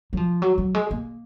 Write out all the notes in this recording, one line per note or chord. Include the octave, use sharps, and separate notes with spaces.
F#3
F3
F#3
F#3
G#3
A#3